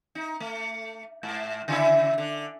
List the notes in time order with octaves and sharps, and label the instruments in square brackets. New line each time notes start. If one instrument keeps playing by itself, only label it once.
[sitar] D#4
A3
G#2
C#3 E4 E5
D3